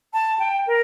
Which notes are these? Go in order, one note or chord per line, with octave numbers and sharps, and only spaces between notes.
A5
G5
A#4